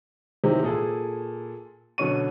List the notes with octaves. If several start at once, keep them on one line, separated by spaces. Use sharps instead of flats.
C3 D#3 E3 F#3 C4 G4
A#2 G#4 A4
B2 D3 F#3 C#4 C#6 D#7